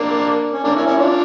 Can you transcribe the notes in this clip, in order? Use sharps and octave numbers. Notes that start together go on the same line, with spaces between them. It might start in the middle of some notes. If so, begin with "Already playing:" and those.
Already playing: A#3 D4
C#4
A#3 D4
C#4 E4
C#4 E4
D4 F4